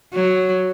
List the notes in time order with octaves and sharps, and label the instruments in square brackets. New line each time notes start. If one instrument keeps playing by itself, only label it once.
[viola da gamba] F#3